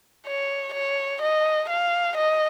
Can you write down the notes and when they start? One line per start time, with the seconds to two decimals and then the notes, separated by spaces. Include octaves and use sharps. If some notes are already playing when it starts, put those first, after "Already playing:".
0.27 C#5
0.74 C#5
1.22 D#5
1.69 F5
2.17 D#5